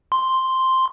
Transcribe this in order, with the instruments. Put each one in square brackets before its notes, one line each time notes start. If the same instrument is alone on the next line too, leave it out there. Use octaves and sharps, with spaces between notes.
[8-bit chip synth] C6